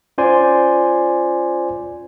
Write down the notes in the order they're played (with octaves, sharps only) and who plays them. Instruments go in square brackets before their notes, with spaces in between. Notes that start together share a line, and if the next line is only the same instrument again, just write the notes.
[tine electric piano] C#4 F4 C5 D5 G#5 C6